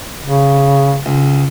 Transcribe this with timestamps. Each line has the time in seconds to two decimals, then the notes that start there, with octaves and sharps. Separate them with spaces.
0.23 C#3
1.06 C#2